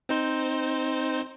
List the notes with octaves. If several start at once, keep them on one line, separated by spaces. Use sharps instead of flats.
C4 D#4 C5